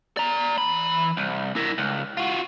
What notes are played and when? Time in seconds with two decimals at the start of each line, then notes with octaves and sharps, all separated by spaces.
0.17 D5 A#5
0.58 E3 B5
1.17 C2
1.56 E4 A#4
1.78 C#2
2.17 F4 F#4